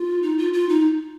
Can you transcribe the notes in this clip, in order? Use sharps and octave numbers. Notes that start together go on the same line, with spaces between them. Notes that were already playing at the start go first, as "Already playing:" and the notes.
Already playing: F4
D#4
F4
F4
D#4